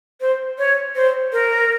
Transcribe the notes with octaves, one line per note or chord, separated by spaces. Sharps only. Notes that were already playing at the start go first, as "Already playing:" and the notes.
C5
C#5
C5
A#4